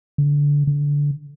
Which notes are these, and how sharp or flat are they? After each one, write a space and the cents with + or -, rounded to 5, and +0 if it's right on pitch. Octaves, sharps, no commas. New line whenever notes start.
D3 -20
D3 -20